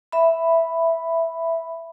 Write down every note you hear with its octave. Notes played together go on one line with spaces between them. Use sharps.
E5 B5